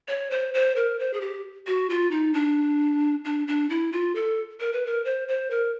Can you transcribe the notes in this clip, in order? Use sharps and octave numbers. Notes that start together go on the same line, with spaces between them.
C#5
C5
C5
A#4
C5
G#4
G4
F#4
F4
D#4
D4
D4
D4
E4
F4
A4
A#4
B4
A#4
C5
C5
A#4